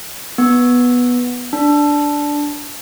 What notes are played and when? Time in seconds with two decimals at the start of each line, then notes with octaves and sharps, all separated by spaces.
0.38 B3
1.53 D4